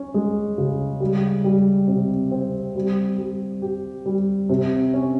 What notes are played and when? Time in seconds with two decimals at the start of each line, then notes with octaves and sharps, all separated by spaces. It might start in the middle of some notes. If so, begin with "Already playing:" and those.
Already playing: C#4
0.14 G#3
0.58 C#3
1.00 G3
1.44 G3
1.88 C3
2.31 C4
2.76 G3
3.18 G3
3.62 G4
4.06 G3
4.49 C3
4.94 C#4